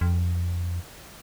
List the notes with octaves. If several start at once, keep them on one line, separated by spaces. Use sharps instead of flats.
F2